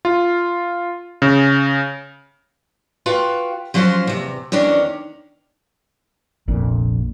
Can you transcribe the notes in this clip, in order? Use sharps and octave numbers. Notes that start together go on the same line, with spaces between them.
F4
C#3
F4 F#4 B4 F5 G5
F3 F#3 C#4 F4 F#4 C5
E2 C3
E2 D#3 C#4 D4 C#5
F1 A#1 F2 A#2